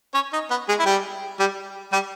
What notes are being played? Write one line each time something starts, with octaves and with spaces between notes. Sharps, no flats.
C#4 C#5
D#4 D#5
B3 B4
G#3 G#4
E4
G3 G4
G3 G4
G3 G4